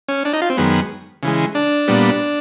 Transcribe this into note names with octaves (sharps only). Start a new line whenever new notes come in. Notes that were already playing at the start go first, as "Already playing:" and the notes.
C#4
D4
D#4
F4
C4
F#2 D#3 G#3 B3
C#3 E3 G#3
D4
A#2 G3 B3